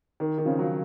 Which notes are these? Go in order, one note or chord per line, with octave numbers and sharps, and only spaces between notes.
D#3
D#3
C#3 F3
F#3